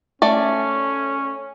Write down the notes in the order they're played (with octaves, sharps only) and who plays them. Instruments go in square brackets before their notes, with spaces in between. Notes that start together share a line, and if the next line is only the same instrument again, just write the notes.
[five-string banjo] A3 D5 [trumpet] C#4